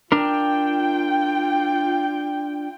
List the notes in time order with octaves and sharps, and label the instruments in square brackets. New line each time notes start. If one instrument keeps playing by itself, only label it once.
[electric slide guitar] D4 A#4 [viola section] F4 G5